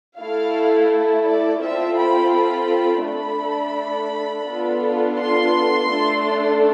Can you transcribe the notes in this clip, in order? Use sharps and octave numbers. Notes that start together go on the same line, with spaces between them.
A3 E4 A4 F5
D5
C4 F4 A4 E5
B5
B5
A3 D4 A4 B5
B3 D4 F4 A4
C6
A3 D4 A4